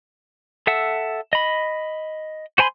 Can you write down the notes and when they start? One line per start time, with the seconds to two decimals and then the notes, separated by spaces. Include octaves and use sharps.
0.67 A4 E5 F#5 E6
1.33 D#5 B5
2.58 F#4 C5 G#5 B5 C6